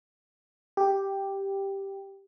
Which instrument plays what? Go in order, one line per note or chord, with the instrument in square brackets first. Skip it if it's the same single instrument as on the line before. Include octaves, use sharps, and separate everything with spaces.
[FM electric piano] G4